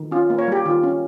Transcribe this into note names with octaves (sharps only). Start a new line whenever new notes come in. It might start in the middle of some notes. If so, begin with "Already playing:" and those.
Already playing: D#3
C#4 F4
A#3
C#5
G3 G4
D#3 F4
C#4